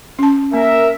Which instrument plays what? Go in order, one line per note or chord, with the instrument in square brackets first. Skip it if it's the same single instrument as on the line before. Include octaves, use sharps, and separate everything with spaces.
[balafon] C#4 A5
[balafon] A#3 [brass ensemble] A#4 E5